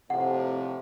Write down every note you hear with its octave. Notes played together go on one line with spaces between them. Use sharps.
F2 A2 C3 F#5